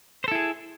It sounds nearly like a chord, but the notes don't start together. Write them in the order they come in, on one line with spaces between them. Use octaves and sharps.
C5 A4 E4 G#4